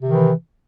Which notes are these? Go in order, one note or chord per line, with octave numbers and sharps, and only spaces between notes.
C3 D#3 E3